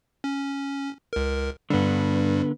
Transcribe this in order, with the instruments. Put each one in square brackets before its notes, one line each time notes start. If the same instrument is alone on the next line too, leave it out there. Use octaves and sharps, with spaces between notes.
[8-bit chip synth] C#4
C#2 A#4
[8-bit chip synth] G2 G3 [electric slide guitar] D3 B3